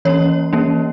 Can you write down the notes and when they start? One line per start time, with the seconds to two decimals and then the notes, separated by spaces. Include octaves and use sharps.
0.05 E3 A#3 C#4 C#5
0.53 E3 A#3 C#4